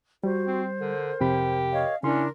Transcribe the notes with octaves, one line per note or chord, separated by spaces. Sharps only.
G3 F#4 C5
C4
D3 A#4
F2 C3 G4 B5
C#5 D#5 F5
C#3 C#4 D4 E4 A#4 C6